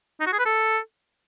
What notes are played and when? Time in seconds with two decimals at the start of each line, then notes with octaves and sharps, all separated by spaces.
0.20 D#4
0.26 F#4
0.33 G#4
0.39 B4
0.45 A4